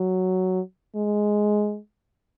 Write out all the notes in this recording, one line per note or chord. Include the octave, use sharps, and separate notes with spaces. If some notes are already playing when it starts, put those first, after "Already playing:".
Already playing: F#3
G#3